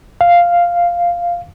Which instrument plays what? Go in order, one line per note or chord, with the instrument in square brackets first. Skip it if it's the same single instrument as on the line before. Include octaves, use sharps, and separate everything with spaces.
[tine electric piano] F5